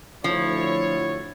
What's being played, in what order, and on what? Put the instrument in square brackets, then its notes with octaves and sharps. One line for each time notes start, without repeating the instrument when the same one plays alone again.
[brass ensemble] D2 E4 C#5 [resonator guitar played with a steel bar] F3